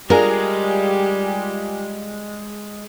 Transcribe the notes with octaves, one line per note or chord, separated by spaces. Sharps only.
G3 G#3 D4 F4 G4 G#4 A#4